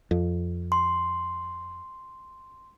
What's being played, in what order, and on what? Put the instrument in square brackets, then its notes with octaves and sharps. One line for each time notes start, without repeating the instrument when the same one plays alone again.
[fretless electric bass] F2
[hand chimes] C6